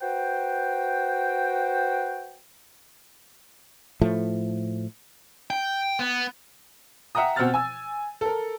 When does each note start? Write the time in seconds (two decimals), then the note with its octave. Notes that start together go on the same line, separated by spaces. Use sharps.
0.01 F#4 B4 C5 G5
4.01 A2 F3 A3
5.50 G5
5.99 B3
7.15 E5 F#5 G5 A#5 D#6
7.36 B2 C4 F#5 E6 F6 A6
7.54 G#5 E6
8.21 A4 A#4